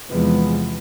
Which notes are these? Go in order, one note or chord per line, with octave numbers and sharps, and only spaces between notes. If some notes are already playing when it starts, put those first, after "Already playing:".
E2 C3 F3 G#3 B3